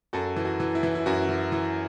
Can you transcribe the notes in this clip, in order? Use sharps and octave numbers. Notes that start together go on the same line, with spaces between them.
F#2 F#4 A4
E3
F#4
E3
E4
E3
E4
F#2 F#4
E3
E3